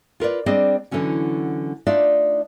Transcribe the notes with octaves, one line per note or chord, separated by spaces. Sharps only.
F4 A#4 B4 D5
G3 C4 D4 G#4 D5 D#5
D3 E3 F#3 C#4 F#4
A3 D4 D#4 F4 D5 E5